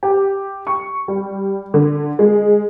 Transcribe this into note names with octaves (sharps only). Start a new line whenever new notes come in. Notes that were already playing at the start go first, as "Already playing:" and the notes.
G4
C#6
G3
D3
G#3